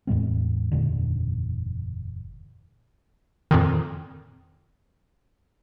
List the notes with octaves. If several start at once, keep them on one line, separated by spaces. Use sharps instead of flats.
E2 A2 G#3 C4
F#1 E2 A#2 D3
F2 A#2 D#3